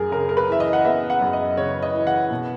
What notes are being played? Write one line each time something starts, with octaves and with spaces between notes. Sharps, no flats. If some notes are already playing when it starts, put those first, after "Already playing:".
Already playing: F#2 G#4 A#4
C#3 A#4
A#4
B4
E3 E5
D#5
F#5
B3 E5
F#5
F#2
D#5
C#3 C#5
D#5
E3
F#5
B2